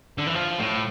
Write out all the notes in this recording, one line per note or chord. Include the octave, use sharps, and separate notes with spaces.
D3
E3
F3
A2